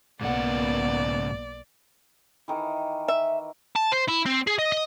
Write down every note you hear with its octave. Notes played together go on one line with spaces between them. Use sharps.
B1 G#2 C#3 A#3 B3 D5 F#5
D#3 E3
E5
A5
C5
E4
C4
G#4
D#5
D#5